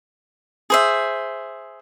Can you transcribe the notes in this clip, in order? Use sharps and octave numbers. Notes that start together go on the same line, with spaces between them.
G#4 C5 E5